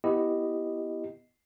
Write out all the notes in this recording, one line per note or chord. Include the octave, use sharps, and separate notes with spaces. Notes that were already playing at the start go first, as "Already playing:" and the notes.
B3 E4 G4 D#5